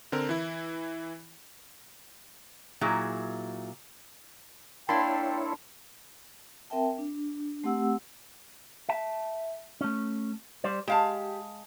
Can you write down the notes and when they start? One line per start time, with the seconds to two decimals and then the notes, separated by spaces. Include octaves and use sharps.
0.12 D3 C4 A#4
0.29 E3 E4
2.81 A#2 F#3 E4 G#4
4.89 A#3 D4 E4 C#5 G5 A5 B5 C6
6.70 C4 A#4 E5 G5 A5
6.98 D4
7.64 A3 C4 G4 F#5 E6
8.89 E5 A5
9.81 A3 C#4
10.64 G3 C5 D5
10.88 G#3 G4 F5 A5